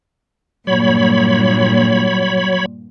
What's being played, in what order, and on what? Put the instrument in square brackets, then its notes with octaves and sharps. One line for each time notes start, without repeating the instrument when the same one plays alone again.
[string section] G2 A#2 [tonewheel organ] F#3 C#5 B5